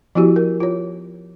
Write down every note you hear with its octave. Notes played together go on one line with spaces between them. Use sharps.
F3 B3 E4 F#4 G4
A#4
F4 C#5